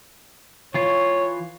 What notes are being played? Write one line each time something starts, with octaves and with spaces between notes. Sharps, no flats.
E3 F4 C#5